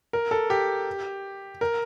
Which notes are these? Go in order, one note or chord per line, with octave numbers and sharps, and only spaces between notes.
A#4
A4
G4
A#4